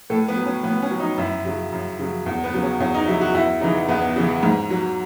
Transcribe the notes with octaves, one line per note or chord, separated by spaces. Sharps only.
A2 A4
B3
F#3
C#4
A2 B3
C#4
F#3
D#4
F#2 E4
C#3 F#3
F#2
C#3 F#3
E2
B3
C#3 F#3
C#4
E2 C#4
D#4
C#3 F#3 E4
F#4
E2 E4
C#3 E3 D#4
E2 B3
C#3 E3
G#2
F#3